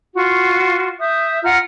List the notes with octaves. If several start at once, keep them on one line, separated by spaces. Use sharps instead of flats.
F4 F#4 C#6
E5 D#6 G6
F4 F#5 A#5 F6